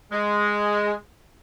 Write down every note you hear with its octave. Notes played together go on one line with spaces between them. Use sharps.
G#3